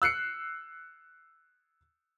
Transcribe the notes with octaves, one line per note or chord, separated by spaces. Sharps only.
E6 F#6 C7 C#7